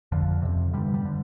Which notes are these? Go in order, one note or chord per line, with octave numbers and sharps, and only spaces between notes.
F2 D3 F3
F2 C3
G2 D3 G3
G3
D3